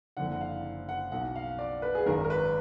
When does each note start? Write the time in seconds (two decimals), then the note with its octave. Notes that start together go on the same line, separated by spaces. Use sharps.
0.17 F#1 F2 D3 F#5
0.32 F#5
0.41 F5
0.89 F#5
1.12 B1 B2 F#5
1.36 F5
1.59 D5
1.82 B4
1.95 G#4
2.06 G#1 F#2 D#3 A#4
2.24 A#4
2.30 B4